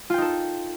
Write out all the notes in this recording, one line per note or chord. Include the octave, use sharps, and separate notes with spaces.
D#4 F4 A4 G5